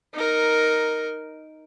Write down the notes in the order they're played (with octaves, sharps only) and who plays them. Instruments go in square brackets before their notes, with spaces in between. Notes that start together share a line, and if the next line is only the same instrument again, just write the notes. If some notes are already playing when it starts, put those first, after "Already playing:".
[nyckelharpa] D#4 A#4